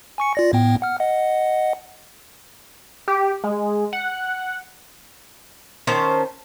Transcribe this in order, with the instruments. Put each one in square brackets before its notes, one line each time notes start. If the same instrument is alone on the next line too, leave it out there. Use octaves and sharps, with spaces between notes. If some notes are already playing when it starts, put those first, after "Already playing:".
[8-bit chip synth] G#5 C#6 C#7
F4 D5 A#6
A2 B3 G5
F#5 F6
D#5 F#5
[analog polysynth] G4
G#3
F#5
[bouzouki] D#3 C#4 C5 A5